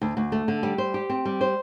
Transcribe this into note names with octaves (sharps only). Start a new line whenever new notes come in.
D2
D2
A3
D3
G3
C5
G4
C4
G3
C5